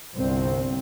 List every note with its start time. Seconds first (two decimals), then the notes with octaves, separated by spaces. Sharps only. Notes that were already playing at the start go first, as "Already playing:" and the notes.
0.14 G1 C2 C4